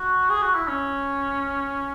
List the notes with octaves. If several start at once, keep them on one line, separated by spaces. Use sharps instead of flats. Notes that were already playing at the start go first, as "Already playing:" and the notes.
Already playing: F#4
G#4
F#4
E4
C#4